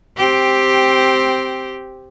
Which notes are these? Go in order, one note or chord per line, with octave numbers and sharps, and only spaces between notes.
C4 G4